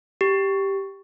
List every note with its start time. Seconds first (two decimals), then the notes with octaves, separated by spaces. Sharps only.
0.21 G4